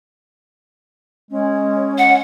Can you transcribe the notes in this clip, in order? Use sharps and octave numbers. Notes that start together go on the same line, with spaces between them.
G#3 C#4
F#5